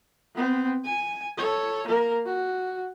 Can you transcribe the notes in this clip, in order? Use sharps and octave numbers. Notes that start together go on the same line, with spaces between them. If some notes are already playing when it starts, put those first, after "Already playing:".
B3 C4
G#5
A4 C#5
A#3 A#4
F#4